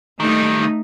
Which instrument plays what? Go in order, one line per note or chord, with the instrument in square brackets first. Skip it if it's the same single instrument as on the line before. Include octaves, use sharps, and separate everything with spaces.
[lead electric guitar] D#3 G3 [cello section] A3 D#4